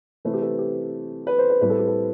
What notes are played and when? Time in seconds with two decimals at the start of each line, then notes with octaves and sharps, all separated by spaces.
0.25 C3 E3 A3 C4 B4
0.34 G4
0.42 A4
0.59 G4
1.27 B4
1.39 C5
1.50 B4
1.61 A2 G3 C4 B4
1.70 A4
1.79 G4
1.88 A4